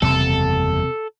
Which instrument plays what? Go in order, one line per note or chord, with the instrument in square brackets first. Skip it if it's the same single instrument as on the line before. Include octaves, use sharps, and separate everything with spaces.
[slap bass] F#1 E2 G3 [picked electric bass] C3 [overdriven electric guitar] A4